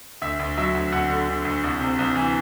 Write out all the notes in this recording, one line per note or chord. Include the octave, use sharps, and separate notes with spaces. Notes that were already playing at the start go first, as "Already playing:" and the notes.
D2 E5
D2
F#3 E5
D2
D2 F#5
D3
D3
D2
C2
C3
C2
E3